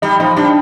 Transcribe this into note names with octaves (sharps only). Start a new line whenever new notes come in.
G3 D#4
F3 D#4
G3 D4